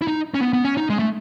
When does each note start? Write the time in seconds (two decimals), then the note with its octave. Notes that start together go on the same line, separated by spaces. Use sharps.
0.02 E4
0.08 D#4
0.34 C#4
0.40 B3
0.53 B3
0.65 C#4
0.77 D#4
0.90 G#3
0.99 A3